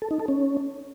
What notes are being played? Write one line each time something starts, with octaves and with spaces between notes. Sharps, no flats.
A4
D#4
A4
C#4